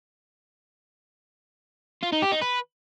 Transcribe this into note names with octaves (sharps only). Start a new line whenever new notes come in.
F4
D#4
G4
D#4
B4